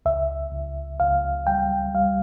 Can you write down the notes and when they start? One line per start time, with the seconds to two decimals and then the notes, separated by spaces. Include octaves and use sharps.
0.05 C#2 E5
0.52 C#2
1.00 C#2 F5
1.47 G3 G5
1.94 G3 F5